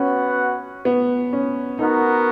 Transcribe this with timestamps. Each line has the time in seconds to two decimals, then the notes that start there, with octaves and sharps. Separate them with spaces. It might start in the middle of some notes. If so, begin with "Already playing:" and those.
Already playing: B3 C#4 F#4 B4 F#5
0.85 B3
1.33 C#4
1.79 B3 D#4 F#4 A#4